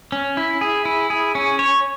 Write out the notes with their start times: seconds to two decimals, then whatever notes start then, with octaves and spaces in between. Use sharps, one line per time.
0.12 C#4
0.37 E4
0.61 G#4
0.85 E4
1.10 G#4
1.35 C#4
1.59 C#5